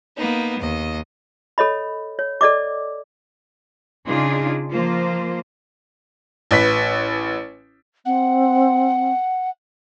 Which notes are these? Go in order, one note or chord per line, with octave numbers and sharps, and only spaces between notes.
A#3 B3 D#4
D#2 D#5
A4 C#5 D#5 B5
C#5
A4 D5 D#5 D6
C#3 D4 D#4 F4 G#4
F3 A#3 F4 C5
A1 B4 B6
C4 F#5